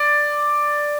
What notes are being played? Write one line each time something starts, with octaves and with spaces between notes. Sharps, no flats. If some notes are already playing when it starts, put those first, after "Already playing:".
Already playing: D5